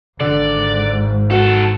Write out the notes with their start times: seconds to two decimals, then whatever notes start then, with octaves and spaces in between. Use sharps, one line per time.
0.20 G#1 G#2 D3 D5
1.31 D#3 F#4 A4